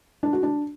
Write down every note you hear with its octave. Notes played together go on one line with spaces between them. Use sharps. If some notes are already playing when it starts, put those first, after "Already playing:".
D4
F#4
D4